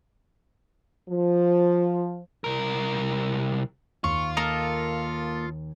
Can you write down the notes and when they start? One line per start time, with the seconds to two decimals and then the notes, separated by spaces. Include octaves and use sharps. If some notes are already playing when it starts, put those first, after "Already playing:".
1.09 F3
2.44 C2 A#4
4.04 D#2 F4 C#6
4.37 A#3 A4 A#4 D#5